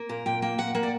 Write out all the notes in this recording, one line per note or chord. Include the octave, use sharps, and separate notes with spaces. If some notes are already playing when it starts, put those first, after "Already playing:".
Already playing: A#3
A#2 A#4
A#2 G5
A#3 G5
A#2 F#5
A#3 F#5
D5